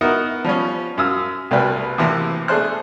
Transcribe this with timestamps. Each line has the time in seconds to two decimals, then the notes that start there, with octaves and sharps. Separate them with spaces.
0.01 B3 D#4 E4 F#4 A#4
0.44 F3 G3 B3 C#4
0.97 F#2 F5 D#6 E6
1.51 C2 F#3 G3 A3 A#4 B4
1.98 A2 C3 E3 A#3 E4
2.48 A3 D4 G#4 A4 C5 F#6